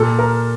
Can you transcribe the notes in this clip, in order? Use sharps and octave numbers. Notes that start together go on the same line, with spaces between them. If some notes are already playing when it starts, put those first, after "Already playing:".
Already playing: A#2 A4
A#4